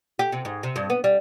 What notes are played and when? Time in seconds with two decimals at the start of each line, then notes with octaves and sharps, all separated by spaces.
0.19 G4
0.32 C3
0.45 G#2
0.63 C3
0.76 G2
0.90 B3
1.04 G3